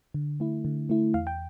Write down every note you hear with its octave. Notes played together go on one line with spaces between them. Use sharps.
D3
A3 E4
D3
A3 E4
E2 F5
G5